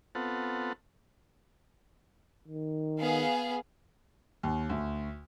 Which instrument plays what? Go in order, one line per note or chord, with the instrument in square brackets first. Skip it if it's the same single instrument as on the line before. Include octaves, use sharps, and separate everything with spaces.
[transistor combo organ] B3 C4 F4 A4 F#5
[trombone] D#3
[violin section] B3 G#4 F5
[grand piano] D#2
D2